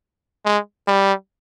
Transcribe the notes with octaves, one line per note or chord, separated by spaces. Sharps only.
G#3
G3